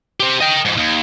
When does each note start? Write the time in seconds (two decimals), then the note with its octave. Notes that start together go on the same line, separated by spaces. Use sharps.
0.20 G4 C5
0.41 D#5 G5
0.65 F2 G#2
0.77 D#2